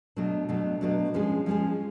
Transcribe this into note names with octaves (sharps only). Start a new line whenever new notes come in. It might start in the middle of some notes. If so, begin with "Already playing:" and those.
B2 F#3 A3 D4
B2 F#3 A3 D4
B2 F#3 A3 D4
F3 G#3 C#4 F4 G#4
F3 G#3 C#4 F4 G#4